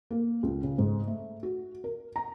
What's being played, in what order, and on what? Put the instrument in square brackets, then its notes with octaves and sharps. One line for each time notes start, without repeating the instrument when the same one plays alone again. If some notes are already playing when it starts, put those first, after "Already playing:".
[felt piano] A#3
C#2
C#3
G#2
A3
F#4
A#4
A#5